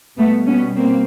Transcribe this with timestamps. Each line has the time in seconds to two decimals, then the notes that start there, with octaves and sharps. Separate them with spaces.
0.17 B2 G3 A3 B3
0.47 B3 C#4
0.76 A#3 C4